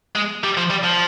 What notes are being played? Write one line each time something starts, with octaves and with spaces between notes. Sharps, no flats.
G#3
G3
F3
G3
F3